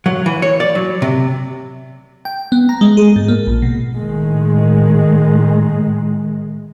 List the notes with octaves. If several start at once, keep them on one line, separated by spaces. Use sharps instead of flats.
F#3
E3
C#5
D5
F#3
C3
G5
B3
A#5
G#3
G#4
G#2
A#3
A#1
B2
A2 D#3 G#3